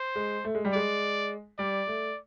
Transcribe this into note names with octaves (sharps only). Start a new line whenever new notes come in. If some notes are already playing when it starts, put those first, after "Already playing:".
Already playing: C5
G#3
A3
G#3
G3
G#3 D5
G3 D5
A3